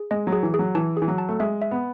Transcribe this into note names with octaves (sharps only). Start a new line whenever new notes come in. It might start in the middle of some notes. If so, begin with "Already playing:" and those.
Already playing: G#4
G#3 D#5
F#3
G#4
E3
G#4
F#3
E3 A5
G#4
E3
F#3
A5
A3
G#3 E5
E5
B3